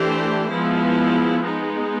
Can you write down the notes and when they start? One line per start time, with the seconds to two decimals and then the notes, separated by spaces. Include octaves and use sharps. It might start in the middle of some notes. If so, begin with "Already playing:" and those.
Already playing: E3 A3 D4 G4 C5
0.51 F3 G#3 B3 E4
1.42 G#3 B3 D#4